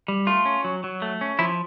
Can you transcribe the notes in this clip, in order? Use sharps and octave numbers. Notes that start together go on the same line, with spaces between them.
G3
A3 F4
C#4
F#3
F#3
A3
C#4
F3 E4